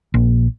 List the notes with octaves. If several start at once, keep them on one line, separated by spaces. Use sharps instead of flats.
A#1